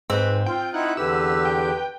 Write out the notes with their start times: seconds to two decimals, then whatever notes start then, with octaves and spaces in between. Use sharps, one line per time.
0.10 G#2 C4 B4
0.46 F4 G5
0.74 D#4 E4 F#5
0.97 E2 D3 G4 B4 E6
1.45 G5